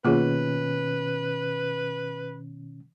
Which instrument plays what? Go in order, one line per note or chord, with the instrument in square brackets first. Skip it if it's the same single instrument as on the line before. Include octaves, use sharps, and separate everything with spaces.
[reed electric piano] B2 D#3 C#4 [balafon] A#3 F4 G#4 [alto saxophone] B4